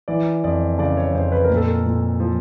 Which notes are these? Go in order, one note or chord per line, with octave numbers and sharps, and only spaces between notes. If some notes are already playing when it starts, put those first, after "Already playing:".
E3 D5
F2 D5
C#3 D5
C#5
F2 C5
B4
A#4
A#2
A4
A#4
A#2
F3